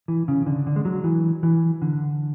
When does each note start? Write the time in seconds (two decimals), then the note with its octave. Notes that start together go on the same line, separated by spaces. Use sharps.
0.08 E3
0.28 C#3
0.46 D3
0.67 D3
0.76 G#3
0.85 F#3
1.04 E3
1.43 E3
1.82 D3